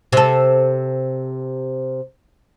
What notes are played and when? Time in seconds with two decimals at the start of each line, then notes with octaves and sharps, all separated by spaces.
0.13 C3 A4